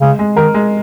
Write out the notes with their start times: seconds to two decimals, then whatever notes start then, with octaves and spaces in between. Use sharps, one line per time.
0.01 C#3 G#3
0.19 G#3
0.37 D#3 A#4
0.54 G#3